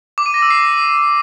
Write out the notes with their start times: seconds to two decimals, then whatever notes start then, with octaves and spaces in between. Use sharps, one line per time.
0.18 D6
0.26 D#7
0.34 A#6
0.42 E6
0.51 C7